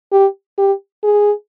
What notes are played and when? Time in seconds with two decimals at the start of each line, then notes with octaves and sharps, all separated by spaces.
0.12 G4
0.58 G4
1.04 G#4